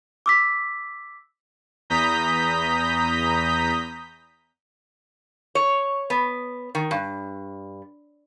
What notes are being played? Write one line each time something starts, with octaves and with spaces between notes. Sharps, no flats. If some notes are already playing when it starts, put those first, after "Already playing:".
D6 E6 B6
E2 A#5 D#6 G6 B6
C#5
B3
D#3
G2